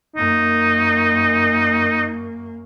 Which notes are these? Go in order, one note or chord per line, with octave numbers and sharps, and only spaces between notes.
F#2 A#3 D#4